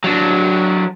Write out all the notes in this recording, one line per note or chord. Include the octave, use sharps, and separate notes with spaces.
F#3 D4